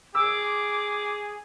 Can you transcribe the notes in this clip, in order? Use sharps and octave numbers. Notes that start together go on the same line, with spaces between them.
G#4 D6 E6